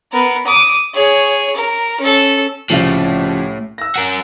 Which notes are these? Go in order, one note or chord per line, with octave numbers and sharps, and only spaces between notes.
B3 A#4
D6 D#6
G#4 C#5
A#4
C#4 A4
C2 A2 C#3 F3
E6 A#6
F#4 A#4